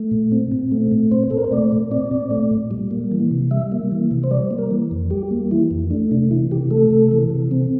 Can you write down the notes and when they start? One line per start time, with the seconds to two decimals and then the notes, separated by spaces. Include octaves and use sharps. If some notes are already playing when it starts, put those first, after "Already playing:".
Already playing: A3
0.11 A#2
0.32 C4
0.52 A#2
0.72 A3
0.91 A#2
1.11 C4 C5
1.30 A#2 A4
1.38 A#4
1.44 C5
1.52 A3 D5
1.72 A#2
1.91 C4 D5
2.11 A#2
2.31 A3
2.51 A#2
2.71 G3
2.91 A#3
3.12 E3
3.31 C3
3.51 G3 E5
3.72 A#3
3.92 E3
4.11 C3
4.24 C5
4.31 G3 D5
4.51 A#3
4.58 A#4
4.71 E3
4.91 F2
5.11 G3 G4
5.31 A#3
5.51 E3 E4
5.71 F2
5.91 A3 D4
6.11 C3 D4
6.31 E3 E4
6.51 C3 G4
6.71 A3 A4
6.90 C3
7.11 E3
7.30 C3
7.51 C4